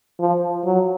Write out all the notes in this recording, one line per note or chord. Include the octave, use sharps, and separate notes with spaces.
F3
F#3